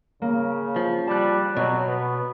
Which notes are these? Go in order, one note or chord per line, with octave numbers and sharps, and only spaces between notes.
C#3 A#3
F3
G3 A5 F#6
B2 F#3
B3